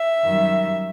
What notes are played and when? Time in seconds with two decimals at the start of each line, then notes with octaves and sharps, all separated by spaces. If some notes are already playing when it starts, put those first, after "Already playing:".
Already playing: E5
0.23 F#2 D#3 G3